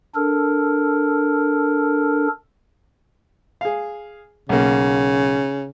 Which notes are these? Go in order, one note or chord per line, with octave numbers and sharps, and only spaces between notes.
D4 A4 A#4
G#4 F5
B1 C#3 A#3